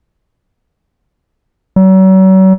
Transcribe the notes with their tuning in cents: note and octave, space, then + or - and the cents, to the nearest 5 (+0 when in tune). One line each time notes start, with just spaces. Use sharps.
F#3 +40